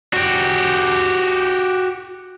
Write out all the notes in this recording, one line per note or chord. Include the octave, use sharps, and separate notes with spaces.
F#4 G4